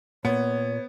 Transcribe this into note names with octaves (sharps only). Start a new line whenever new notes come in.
A#2 B3 C#5